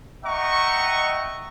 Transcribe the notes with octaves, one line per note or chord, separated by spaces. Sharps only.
D#5 E5 F#5 G5 A#5 C#6